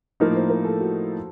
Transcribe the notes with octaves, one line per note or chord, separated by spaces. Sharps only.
A2 F3 A#3 D#4 A#4
C5
A#4
A4
F#4